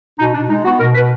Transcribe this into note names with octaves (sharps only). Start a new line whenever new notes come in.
B2 D#4
B2 D4
G#3 D#4
B3 F#4
B2 A#4
B2 B4